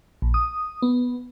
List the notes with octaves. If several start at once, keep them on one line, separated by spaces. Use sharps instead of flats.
A#1
D#6
B3